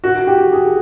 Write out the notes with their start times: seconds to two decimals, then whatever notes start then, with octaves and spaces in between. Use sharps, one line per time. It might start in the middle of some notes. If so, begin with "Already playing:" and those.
0.04 F#4
0.27 G4
0.53 G#4